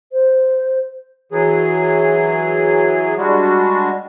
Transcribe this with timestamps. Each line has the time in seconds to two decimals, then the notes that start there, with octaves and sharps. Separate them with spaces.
0.12 C5
1.32 E3 F#3 G#4
3.18 G3 G#3 D4 F#4